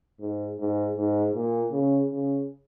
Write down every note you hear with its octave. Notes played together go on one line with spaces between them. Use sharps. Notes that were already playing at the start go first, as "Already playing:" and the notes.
G#2
G#2
G#2
A#2
C#3
C#3